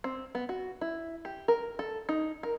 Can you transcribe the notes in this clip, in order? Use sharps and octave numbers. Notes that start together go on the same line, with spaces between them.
C4
B3
F#4
E4
G4
A#4
A4
D#4
A#4